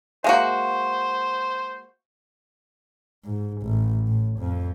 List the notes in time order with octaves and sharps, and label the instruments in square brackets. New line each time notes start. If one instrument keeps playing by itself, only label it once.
[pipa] G#3 A#3 F#4 [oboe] C5 [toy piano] E5 F5 G#5
[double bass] G#2
A1
A2
F2